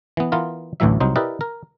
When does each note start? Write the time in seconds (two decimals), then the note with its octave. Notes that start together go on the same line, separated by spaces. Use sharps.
0.17 E3 B3
0.32 E3 B3 F4 A#4
0.80 A1 D2 A2 E3 F#3 E5
1.00 C2 F#3 D#4 C5
1.16 E4 G4 A#4 B4 D5 D#5
1.41 A#4